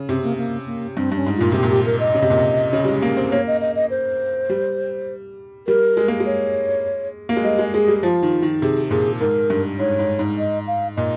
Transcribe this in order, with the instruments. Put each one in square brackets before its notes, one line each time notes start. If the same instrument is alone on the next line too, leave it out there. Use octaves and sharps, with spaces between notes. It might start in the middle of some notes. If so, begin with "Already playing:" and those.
Already playing: [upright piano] C#3
[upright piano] C3 [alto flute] C4
[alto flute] A#3
A#3
A#3
[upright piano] G2 [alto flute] C4
[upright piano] G2 [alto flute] C#4
[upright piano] G#2
[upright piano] A#2 [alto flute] F4
[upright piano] C3 [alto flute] G4
[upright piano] A#2
[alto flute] G4
A#4
D#5
[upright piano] C#3
C3
A#2
C3
C#3
G3
G#3
A#3
C4
[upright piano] A#3 [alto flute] C#5
[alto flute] D#5
D#5
D#5
C5
[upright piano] G3
[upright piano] G3 [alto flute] A#4
[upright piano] G#3
A#3
G#3
[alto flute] C#5
[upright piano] A#3
G#3
[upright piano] G3 [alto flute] D#5
[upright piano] G#3
[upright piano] G#3 [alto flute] G#4
[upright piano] G3
[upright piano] F3 [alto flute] F4
[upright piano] D#3
D#3
[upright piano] C3 [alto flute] G#4
[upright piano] A#2 [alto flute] G#4
[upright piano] G#2 [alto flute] A#4
[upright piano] G2
[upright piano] G#2 [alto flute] C#5
[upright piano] G#2
G#2
[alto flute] D#5
F5
[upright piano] A#2 [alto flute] D#5